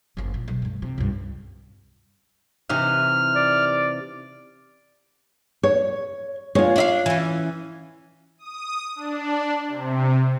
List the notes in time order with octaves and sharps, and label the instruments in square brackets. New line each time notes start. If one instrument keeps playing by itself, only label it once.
[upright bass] F#1 A#3
A#2
B1
G2 A3
C3
C#2 G2
[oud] C3 E3 D#4 [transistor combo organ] F6
[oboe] D5
[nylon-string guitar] C#5
[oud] G#3 [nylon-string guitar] F4 C#5
[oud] D4 E5 F5
E3 C#4
[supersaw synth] D#6
D4
C3